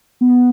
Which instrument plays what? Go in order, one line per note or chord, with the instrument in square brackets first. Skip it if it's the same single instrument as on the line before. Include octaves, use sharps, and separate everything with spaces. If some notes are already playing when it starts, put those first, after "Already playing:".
[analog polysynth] B3